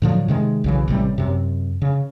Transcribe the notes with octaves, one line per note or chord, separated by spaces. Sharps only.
A2 D3 F3 F#3
C3 D#3 G#3
B1 C#3 E3
A1 C3 F#3 G3
F#2 C3
C#3